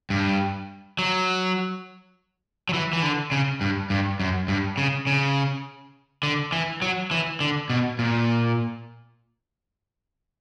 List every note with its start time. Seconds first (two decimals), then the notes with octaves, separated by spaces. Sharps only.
0.10 G2
0.99 F#3
2.69 F#3
2.73 E3
2.93 E3
3.02 D3
3.32 C#3
3.61 G2
3.90 G2
4.20 F#2
4.48 G2
4.78 C#3
5.07 C#3
6.23 D3
6.52 E3
6.82 F#3
7.11 E3
7.40 D3
7.70 B2
7.99 A#2